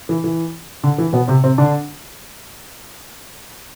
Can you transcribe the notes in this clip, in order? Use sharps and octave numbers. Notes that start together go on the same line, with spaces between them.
E3
E3
D3
E3
B2 B3
C3 C4
C3 C4
D3 D4